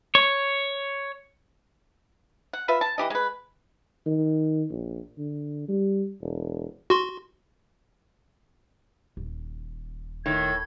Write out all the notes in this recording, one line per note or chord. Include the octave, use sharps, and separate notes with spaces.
C#5
F#5
F4 B4 E5
A5
E3 G4 D#5
G#3 B4
D#3
A#1
D3
G3
E1
F#4 C6
D#1
A2 D#3 G#6